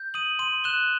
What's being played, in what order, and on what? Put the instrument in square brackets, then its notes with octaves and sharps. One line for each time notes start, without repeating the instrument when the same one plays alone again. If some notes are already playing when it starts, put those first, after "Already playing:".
Already playing: [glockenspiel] G6
D#6 D#7 F#7
C6 D#7 F#7
F#6 E7 G7